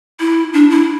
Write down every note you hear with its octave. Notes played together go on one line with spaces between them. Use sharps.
E4
D4
E4